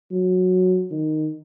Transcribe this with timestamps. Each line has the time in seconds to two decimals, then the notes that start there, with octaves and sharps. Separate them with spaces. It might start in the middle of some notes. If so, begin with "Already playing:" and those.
0.11 F#3
0.91 D#3